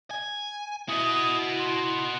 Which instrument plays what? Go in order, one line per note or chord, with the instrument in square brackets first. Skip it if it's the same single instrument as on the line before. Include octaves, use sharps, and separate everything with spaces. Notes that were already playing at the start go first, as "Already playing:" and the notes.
[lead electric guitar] G#5
[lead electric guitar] E4 [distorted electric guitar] F#4 D#5 [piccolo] D#6
[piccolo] C6